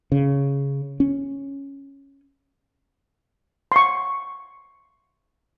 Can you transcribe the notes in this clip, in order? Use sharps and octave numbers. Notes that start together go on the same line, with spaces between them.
C#3
C#4
C6 C#6